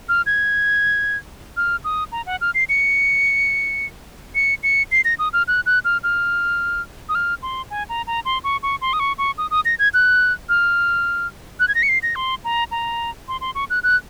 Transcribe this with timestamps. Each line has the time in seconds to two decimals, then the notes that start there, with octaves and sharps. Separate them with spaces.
0.09 F6
0.26 G#6
1.57 F6
1.84 D#6
2.12 A#5
2.26 F#5
2.41 F6
2.54 C7
2.69 C#7
4.35 C#7
4.63 C#7
4.92 C7
5.05 A#6
5.19 D#6
5.33 F6
5.48 F#6
5.66 F#6
5.85 F6
6.03 F6
7.09 D#6
7.15 F6
7.43 C6
7.70 G#5
7.89 A#5
8.07 A#5
8.25 C6
8.44 C#6
8.63 C#6
8.81 C6
8.93 D#6
9.00 C#6
9.18 C#6
9.38 D#6
9.51 D#6
9.65 A#6
9.79 G#6
9.94 F#6
10.49 F6
11.60 F#6
11.68 G#6
11.75 A#6
11.83 C#7
11.89 C7
12.03 A#6
12.16 C6
12.45 A#5
12.71 A#5
13.28 C6
13.41 C6
13.55 C#6
13.70 F#6
13.83 F#6